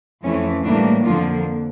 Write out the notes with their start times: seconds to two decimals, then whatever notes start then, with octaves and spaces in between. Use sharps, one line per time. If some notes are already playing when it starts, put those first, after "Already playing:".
0.23 F2 E3 A3 C#4
0.63 A2 E3 G3 A#3 D4
1.04 F2 D3 F3 A#3 F4